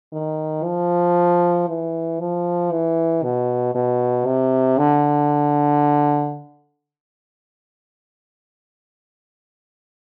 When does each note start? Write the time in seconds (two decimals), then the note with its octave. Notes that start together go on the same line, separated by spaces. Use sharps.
0.13 D#3
0.65 F3
1.69 E3
2.20 F3
2.71 E3
3.23 B2
3.75 B2
4.26 C3
4.78 D3